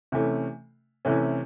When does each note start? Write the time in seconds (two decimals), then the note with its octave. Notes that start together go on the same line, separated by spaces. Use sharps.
0.12 C3 E3 A3 C#4
1.05 C3 E3 A3 C#4